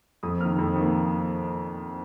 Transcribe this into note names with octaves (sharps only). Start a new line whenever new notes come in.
F2 D#6
D#3 A#3 F6
F2
D#3 A#3